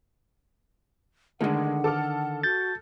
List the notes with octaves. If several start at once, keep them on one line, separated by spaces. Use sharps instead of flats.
D3 D#3 G#3 A3 F#5
A4 D6 F6
F#4 G6 A6